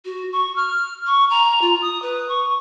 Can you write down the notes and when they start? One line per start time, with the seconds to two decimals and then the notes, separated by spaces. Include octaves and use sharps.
0.05 F#4
0.32 C#6
0.56 F6
1.07 C#6
1.30 A#5
1.61 F4
1.81 D#6
2.02 B4
2.29 C#6